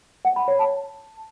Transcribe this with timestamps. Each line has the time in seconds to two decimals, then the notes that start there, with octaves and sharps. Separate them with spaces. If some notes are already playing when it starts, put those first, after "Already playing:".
0.25 F#5
0.36 B5
0.48 C#5
0.59 A5